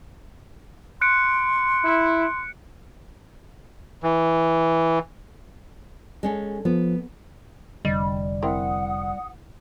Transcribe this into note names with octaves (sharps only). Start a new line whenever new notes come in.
C6 F#6 C#7 D7
E4
E3
G#3 C#4 A4
F3 B3
F1 D3 G3 D#5
C4 E4 A#4 F#5 D#6